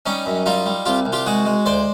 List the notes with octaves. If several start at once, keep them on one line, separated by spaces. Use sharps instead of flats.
G3 C#4 D#4
F#2
G3 D#4 F4
G3
C2 F4 G4
C2
F4 G4
G#3 F#4 G#4
G#3
D2 C5 D5